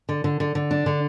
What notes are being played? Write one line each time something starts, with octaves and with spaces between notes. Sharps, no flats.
D3
D3
D3
D3
D4
D3